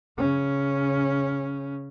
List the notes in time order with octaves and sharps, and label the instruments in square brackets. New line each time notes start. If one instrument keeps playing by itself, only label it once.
[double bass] C#3 C#4